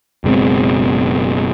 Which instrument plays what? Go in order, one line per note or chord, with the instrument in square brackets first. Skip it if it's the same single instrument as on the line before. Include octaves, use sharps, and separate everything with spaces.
[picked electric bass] F#1 B2 G#3 C4